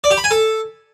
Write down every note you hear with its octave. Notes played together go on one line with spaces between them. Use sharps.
D5
G4
B5
G#5
A4